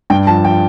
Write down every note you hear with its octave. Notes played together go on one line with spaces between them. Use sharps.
G2 G5
F3 A5
F3 G5